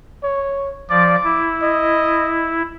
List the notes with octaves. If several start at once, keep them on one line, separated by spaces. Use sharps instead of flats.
C#5
F3 D5 D6
E4
D#5